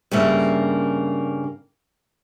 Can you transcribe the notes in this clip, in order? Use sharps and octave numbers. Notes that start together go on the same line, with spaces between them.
G2 C#3 A#3 E5